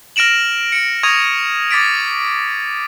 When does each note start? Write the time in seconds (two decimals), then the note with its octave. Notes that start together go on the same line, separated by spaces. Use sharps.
0.16 F6 A#6 D7 E7 F#7
0.72 C#7 D7
1.03 C#6 D#6 G#6 A#6 D#7 F7
1.71 D6 A6 B6 D7